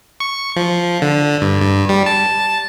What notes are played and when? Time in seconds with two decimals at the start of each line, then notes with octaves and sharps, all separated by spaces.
0.20 C#6
0.56 F3
1.02 D3
1.41 G2
1.61 G2
1.89 G3
2.06 A5